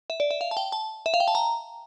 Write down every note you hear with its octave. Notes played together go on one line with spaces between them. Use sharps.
E5
D5
E5
F5
A5
G5
A5
E5
F5
G5
A5
A#5